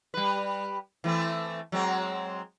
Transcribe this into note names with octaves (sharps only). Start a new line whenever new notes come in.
G3 B4
E3 A3 C4
F#3 G#3 C4